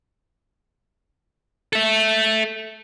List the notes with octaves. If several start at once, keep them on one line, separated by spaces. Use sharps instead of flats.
A4 E5